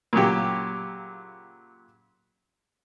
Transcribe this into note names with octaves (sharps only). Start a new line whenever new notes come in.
A#2 C#3 F#3 G4